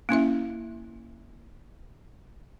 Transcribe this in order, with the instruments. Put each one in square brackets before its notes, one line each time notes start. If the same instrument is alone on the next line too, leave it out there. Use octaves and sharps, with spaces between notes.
[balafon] A#3 C#4 E4 E5